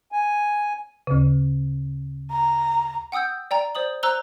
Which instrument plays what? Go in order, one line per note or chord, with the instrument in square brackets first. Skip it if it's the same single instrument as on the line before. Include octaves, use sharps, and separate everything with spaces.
[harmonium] G#5
[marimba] D2 C#3
[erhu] A#5
[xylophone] F#5 G5 D#6 E6 G6
D5 G5 A#5
C5 D5 D#6 F#7
C5 A#5 E6 F#6 F7 G7